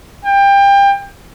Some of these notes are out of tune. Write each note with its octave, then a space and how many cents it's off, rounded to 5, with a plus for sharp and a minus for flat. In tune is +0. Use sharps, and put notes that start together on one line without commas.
G5 +25